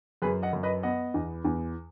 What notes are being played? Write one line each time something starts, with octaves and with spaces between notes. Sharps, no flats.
F#2 G#4 B4
D#5 F#5
F#2
B4 D#5
B3 D#5 F#5
E2
E2